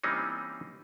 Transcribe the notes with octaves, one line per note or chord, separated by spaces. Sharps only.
E3 G3 A#3 C4 C#4 D#4